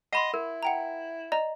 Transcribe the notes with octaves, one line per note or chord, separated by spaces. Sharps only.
D#5 F#5 B5 C6
E4 A#4
F#5 G5 A#5
D5 D#5 A#5